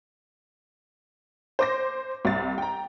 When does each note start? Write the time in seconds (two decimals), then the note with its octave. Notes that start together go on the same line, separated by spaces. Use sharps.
1.59 C5 D6 A#6
2.25 C2 A6
2.58 G5 A#5